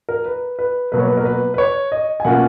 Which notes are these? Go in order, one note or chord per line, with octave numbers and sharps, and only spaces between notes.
A#4
B4
B4
B2 F#3 A#3 B4
C#5
B4
A#4
B4
B4
C#5
D#5
G#5
B2 A#3 C#4 F4 F#5